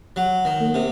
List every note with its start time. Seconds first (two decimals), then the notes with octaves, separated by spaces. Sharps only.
0.16 F#3
0.45 D#3
0.61 A#3
0.74 C3